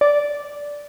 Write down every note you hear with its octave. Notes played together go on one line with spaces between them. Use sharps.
D5